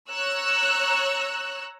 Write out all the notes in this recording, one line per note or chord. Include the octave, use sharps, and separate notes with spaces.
C#5 A#5 E6 F#6